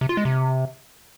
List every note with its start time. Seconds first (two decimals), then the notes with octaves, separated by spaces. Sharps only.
0.01 C3
0.09 F4
0.17 G#3
0.25 C3